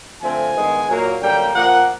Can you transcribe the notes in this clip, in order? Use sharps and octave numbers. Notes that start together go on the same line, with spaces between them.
D3 F3 A3 C4 G#5
G2 D#3 G#3 B3
A#2 F#3 A#3
F#2 D3 G3 A#3 G5
A#2 F3 A#3 F#5